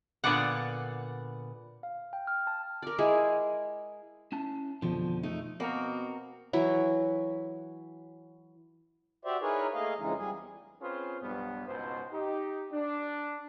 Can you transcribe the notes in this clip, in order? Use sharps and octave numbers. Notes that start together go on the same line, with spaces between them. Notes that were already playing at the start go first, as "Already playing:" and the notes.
A#2 D3 B3 D5 F#5
F5
G5
F6
A5
A#4 D5
G#3 E4 G#4
C#4 E4 A5
F2 B2 D3 F3
A3 D#4
B2 A#3 C4 F#4 A#4
E3 F#3 E4
F#4 G4 C5 D5 E5
D#4 E4 G#4 A#4 B4 C#5
A3 A#3 G#4 D#5 F5
F2 C#3 E3 G#3 D#4
G3 G#4
E2
C4 C#4 F4 G#4 B4 C5
B1 G2 B3
C#2 G#2 B2 C5
D#4 G4
D4